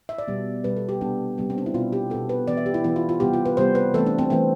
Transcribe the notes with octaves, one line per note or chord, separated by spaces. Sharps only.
E5
D5
B2 G3 B3
B2 G3 B3 B4
A4
G4
C3 G3 B3 D4
C3 G3 B3
C4
D4
E4
B2 B3 F4
G4
B2 B3 A4
B4
E3 B3 D5
E5
G4
E4
E3 B3 E4
F4
F4
C3 G3 B3 G4
F4
B4
C3 G3 B3 C5
B4
E3 A3 C4 A4
D4
C4
E3 A3 C4